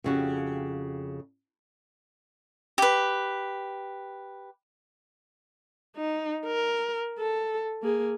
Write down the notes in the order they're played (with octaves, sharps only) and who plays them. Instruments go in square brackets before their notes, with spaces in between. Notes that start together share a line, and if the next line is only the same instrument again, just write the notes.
[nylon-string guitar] F2 C#3 F#4 G4
[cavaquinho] G4 B4
[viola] D#4
A#4
A4
A#3 G#4